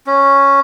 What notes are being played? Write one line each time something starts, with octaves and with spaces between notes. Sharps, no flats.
C#4